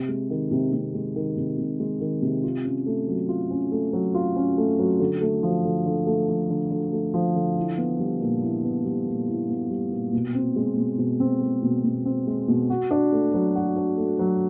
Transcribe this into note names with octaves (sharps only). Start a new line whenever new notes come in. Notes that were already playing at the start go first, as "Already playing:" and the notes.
Already playing: C3
G#3
D#3
C3
C3
G#3
D#3
C3
C3
G#3
D#3
C3
F4
C#4
A3
F#3
F4
C#4
A3
F#3
F4
C#4
A3
F#3
D3
A3
F3
D3
D3
A3
F3
D3
D3
A3
F3
D3
E4
B3
G3
A#2
E4
B3
G3
A#2
E4
B3
G3
A#2
B2
C4
G#3
B2
B2
C4
G#3
B2
B2
C4
G#3
B2
F#4
D4
A3
F#3
F#4
D4
A3
F#3